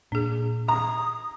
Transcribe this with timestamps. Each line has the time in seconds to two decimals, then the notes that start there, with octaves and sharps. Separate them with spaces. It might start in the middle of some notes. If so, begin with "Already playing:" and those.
0.12 A#2 D4 G#4
0.68 A#5 D#6